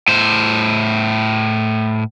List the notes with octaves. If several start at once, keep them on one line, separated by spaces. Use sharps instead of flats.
A2 C5